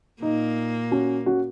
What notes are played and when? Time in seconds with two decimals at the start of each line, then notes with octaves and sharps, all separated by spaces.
0.22 A#2 A#3 D#4
0.91 C#4 F#4
1.26 C#4 F#4